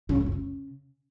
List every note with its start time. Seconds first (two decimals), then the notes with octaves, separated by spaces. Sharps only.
0.09 C#3
0.15 G#2
0.21 E2
0.26 F2
0.32 C#3